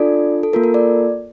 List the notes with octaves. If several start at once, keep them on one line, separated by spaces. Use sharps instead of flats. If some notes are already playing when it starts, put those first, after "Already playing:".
Already playing: D4 F4 A4 D5
A4
A#3 F4 A4 A#4
A#4
D5